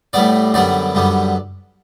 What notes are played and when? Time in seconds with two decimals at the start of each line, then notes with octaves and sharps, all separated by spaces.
0.13 A2 G3 B3 D5
0.54 F#2 D3 G3 B3 D5
0.95 F#2 D3 G3 B3